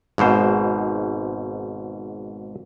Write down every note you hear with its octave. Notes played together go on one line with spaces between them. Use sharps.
G#1 G#2 B2 C5